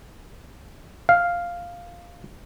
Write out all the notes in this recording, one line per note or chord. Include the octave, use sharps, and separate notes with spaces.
F5